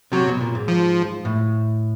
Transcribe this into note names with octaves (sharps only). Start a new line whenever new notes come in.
C3 F#3
B2
A#2
G#2
F3
A2